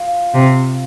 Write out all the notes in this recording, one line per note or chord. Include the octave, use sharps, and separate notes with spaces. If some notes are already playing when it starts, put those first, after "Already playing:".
Already playing: F4
C3